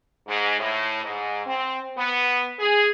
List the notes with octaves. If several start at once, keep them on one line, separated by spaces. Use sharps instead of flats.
G#2
A2
G#2
C4
B3
G#4